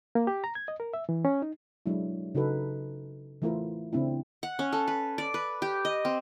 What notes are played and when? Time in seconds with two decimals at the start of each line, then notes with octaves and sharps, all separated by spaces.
0.15 A#3
0.27 G4
0.44 A#5
0.55 G#6
0.68 D#5
0.80 A#4
0.94 E5
1.09 E3
1.25 C#4
1.42 D#4
1.86 F#3 G#3 D4 E4
2.35 C#3 D#4 F#4 A4 B4
3.42 E3 A3 E4 F4 A#4 C5
3.93 C#3 C4 D4 E4
4.43 F#5
4.59 C#4
4.73 A4
4.88 B4
5.18 D5
5.34 B4
5.62 G4
5.85 D#5
6.05 C4